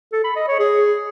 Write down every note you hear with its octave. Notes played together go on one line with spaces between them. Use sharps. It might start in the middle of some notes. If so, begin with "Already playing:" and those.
A4
B5
D#5
C#5
G#4